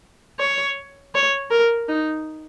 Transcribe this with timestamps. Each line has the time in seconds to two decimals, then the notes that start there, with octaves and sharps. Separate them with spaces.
0.39 C#5
1.15 C#5
1.51 A#4
1.88 D#4